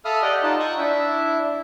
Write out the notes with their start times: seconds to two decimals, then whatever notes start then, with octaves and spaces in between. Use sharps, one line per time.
0.05 A4 E5 F5 B5 D#6 F6
0.22 G4 D5 D#5 F#5
0.43 D#4 F4 F#5 A5
0.60 G5 C#6 D#6 F#6
0.78 D4 E4 E5